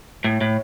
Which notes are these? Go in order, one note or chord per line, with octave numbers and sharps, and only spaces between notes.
A2
A2